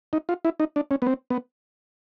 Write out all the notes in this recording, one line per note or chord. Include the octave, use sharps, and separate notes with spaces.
D#4
F4
E4
D#4
D4
C#4
B3
C4
B3